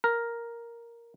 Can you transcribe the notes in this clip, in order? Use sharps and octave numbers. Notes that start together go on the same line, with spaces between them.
A#4